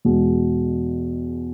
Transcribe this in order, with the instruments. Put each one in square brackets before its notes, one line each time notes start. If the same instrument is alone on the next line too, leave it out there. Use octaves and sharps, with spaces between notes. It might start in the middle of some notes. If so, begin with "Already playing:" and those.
[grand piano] E2 B2 G#3